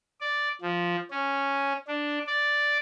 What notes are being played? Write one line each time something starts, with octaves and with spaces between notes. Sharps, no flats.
D5
F3
C#4
D4
D5